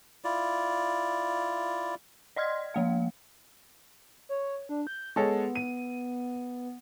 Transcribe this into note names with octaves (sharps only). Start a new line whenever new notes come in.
E4 F4 D5
D5 D#5 C6 F6 G#6
F3 A#3 F5
C#5
D4
G6
G#3 B3 A4 C#5
D#7